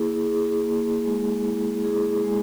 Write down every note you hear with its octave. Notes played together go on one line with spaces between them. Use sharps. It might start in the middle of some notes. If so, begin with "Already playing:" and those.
Already playing: A#3 E4 G#4
E4 G#4
A#3
G#3
E4
E4 G#4
G#3